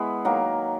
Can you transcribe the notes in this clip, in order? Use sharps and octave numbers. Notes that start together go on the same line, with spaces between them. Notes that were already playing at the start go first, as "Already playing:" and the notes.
Already playing: G#3 B3 E4
D#3 F#3 A#3